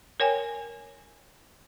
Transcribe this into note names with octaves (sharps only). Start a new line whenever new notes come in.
A#4 C#5 G5 G#5